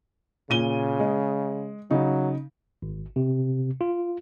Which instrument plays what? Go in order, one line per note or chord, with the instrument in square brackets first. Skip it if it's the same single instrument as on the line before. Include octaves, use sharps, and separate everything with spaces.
[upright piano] A#2 D#7 G7 [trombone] C#3
[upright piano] G#3
[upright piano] C#3 D#4 [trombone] F#3
[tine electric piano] G#1
C3
F4